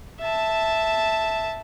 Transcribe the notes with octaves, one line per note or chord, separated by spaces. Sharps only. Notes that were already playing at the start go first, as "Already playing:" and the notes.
E5 A5